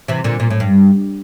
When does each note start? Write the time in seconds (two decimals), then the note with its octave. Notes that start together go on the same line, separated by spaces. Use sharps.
0.08 C3 E3
0.24 A#2 D3
0.40 A#2
0.50 A2
0.60 G2